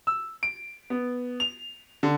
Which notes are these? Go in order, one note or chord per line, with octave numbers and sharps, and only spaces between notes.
E6
D7
B3
F7
D3